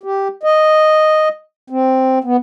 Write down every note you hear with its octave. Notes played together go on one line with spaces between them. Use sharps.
G4
D#5
C4
B3